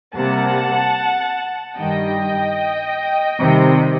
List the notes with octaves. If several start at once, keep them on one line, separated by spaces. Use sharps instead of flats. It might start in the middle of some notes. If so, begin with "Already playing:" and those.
C3 G3 A#3 F#5 A5
G2 D#3 G3 D#5 G5
C3 D#3 G3